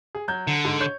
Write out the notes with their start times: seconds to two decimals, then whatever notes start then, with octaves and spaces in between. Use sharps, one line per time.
0.15 G#4
0.28 F#3 G6 G#6
0.47 D3
0.65 G#2
0.80 C#5 G6